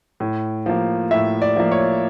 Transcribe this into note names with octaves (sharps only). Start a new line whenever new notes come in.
A2
F3 A#3
A2 E5
D5
F3 A#3
C#5